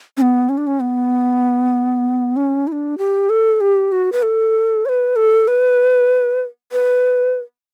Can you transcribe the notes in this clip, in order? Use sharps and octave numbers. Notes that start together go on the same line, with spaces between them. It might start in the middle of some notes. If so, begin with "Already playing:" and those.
C#4
B3
C#4
D4
C#4
B3
C#4
E4
D4
G4
A4
G4
F#4
B4
A4
C#5
B4
A4
B4
B4